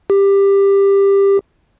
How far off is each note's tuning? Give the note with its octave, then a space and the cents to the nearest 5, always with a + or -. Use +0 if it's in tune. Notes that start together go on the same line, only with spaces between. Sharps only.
G4 +15